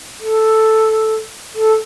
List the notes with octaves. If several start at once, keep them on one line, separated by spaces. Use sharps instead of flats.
A4
A4